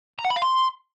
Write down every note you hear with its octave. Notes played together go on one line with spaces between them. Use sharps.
A#5
F#5
B5
F5
C6